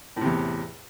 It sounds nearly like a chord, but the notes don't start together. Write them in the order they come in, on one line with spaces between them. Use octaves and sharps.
A2 C3 E2